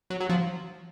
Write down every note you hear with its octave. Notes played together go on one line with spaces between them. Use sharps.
F#3
F#3
F3